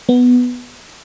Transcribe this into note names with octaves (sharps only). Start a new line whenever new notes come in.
B3